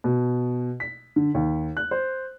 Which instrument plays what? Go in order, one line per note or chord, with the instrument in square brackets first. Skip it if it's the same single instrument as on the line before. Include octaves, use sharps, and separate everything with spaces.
[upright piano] B2
B6
D3
D#2
F#6
C5